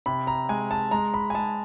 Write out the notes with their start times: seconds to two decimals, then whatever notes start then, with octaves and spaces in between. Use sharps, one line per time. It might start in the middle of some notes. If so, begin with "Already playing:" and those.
0.06 C3 B5
0.27 A#5
0.49 G#3 G#5
0.71 A5
0.91 G#3 A#5
1.14 B5
1.30 G#5
1.34 G#3 A5